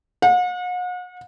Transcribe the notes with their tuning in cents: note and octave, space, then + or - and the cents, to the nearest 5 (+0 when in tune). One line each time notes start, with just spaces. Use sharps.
F#5 -40